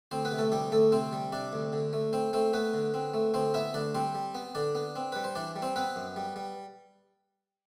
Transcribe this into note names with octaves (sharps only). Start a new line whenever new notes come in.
D2 C4 C5
B3 B4
C3
A3 A4
D2 G3 G4
D2 A3 A4
C3 C4 C5
G3
C3 D4 D5
D2
D3
A3
C4 C5
A3 C4 C5
A3 B3 B4
D3
C4
A3
D2 C4 C5
B3 E4 E5
D2 D4 D5
G3 C4 C5
G3
B3
D3 D4 D5
B3
C4
G3 B4
C5
E3 D4 D5
G3
C4 C5
B3 C4 B4
F#2
G3
G3